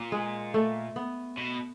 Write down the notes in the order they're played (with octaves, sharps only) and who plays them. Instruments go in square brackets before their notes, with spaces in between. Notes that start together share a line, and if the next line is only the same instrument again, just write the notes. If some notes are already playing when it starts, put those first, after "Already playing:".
Already playing: [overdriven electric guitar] A#2
[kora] G#3
A3
B3
[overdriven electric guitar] B2